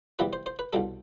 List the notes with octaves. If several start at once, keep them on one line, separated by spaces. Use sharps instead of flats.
E2 C3 E3 G3 B4
C5
C5
B4
C2 B2 G3 A4